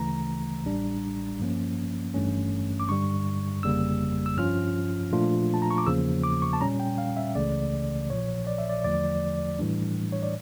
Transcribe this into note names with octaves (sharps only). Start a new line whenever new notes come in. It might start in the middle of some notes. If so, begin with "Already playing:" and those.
Already playing: D2 C#3 E3 A3 A#5
A1 A2 G3 D4
G2 F3 A#3 C#4
G1 G2 E3 A3 C#4
D6
G2 D3 G3 C#6
G1 F2 C#3 G3 A#3 E6
E6
G2 F3 C#4 F4 F6
A#2 F3 A3 D4 F4
A5
A#5
C#6
D6
E2 C#3 F3 A#3 E6
D6
C#6
A5
A#2 G3 C#4 A#5
G5
F5
E5
C#2 C#3 E3 A3 D5
A#1 A#2 F3 C#5
D5
E5
D5
E2 D3 F3 A3 D5
A2 E3 G3 D4
C#5
D5